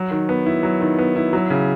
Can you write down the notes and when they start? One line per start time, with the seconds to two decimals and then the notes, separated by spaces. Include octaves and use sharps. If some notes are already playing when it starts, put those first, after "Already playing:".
Already playing: F#3
0.11 D#3
0.29 B3
0.46 E4
0.63 F#3
0.81 D#3
0.99 B3
1.16 E4
1.33 F#3
1.50 C#3